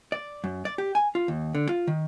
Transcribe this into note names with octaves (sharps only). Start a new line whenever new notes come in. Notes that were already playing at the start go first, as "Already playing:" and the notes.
D5
F#2
D5
G4
G#5
F4
D#2
D3
F4
D#3